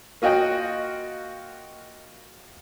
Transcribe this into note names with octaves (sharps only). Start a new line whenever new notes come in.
A#3 F4 F#4 D#5 G5